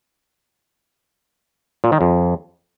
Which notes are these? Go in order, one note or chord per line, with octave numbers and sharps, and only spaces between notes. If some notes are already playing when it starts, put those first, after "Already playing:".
A#2
D#3
F2